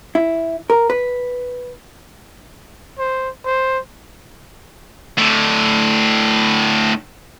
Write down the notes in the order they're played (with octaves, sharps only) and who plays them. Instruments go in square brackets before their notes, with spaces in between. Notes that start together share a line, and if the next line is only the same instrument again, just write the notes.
[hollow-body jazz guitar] E4
A#4
B4
[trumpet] C5
C5
[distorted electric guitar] A2 D3